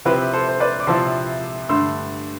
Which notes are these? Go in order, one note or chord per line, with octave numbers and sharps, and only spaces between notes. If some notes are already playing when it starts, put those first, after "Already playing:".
C3 F3 C4 E4 G4 B4
A4 C5
C5
B4 D5
D6
C3 F3 C4 E4 A5 C6
G2 D3 A3 C6 E6